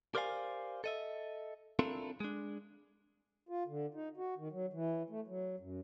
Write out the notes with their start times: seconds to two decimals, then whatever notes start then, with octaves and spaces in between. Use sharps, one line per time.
0.15 G4 A#4 C5 D5 F5 G#5
0.84 A4 D#5 E5
1.79 C4 D4 E4 F4 A4 A#4
2.20 G#3 D4
3.49 F4
3.67 D3
3.94 D#4
4.17 F#4
4.38 D#3
4.52 F#3
4.73 E3
5.10 A3
5.27 F#3
5.60 F#2